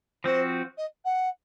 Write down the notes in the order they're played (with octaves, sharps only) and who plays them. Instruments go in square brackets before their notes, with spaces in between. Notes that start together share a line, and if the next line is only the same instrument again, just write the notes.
[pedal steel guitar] F3 C4 F#4 [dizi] C5
[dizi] D#5
F#5